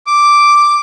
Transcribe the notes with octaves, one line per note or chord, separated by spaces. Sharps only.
D6